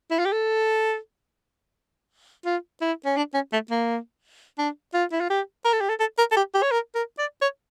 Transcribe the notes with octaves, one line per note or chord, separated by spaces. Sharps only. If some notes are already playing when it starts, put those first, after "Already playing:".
E4
F4
G4
A4
F4
E4
C#4
D4
C#4
A3
A#3
D4
F4
E4
F4
G4
A#4
A4
G4
A4
A4
A#4
A4
G4
G4
C#5
A#4
A#4
D5
C#5